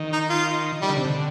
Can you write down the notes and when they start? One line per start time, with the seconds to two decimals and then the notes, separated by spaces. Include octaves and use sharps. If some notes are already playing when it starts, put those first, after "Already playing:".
Already playing: D#3
0.13 D#4
0.30 F4
0.81 D#3 G3
0.90 D3
0.97 C3
1.05 D3